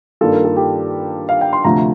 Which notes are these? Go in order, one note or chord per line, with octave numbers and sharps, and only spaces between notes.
G2 D#3 A#3 F4 A4
A#4
A4
G4
F5
G5
C6
D2 C3 F3 A3 A#5